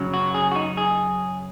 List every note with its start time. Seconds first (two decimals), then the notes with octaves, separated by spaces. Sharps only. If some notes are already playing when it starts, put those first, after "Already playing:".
Already playing: F#2 C#3 F#3
0.14 F#4
0.34 G#4
0.52 F#4
0.56 D#4
0.77 G#4